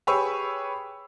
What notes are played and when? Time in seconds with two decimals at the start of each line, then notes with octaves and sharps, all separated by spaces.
0.07 G4 G#4 B4 C#5 C#6 E6